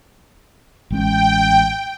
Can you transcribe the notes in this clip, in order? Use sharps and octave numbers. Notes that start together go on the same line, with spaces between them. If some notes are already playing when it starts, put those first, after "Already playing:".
A1 G#3 C#4 G5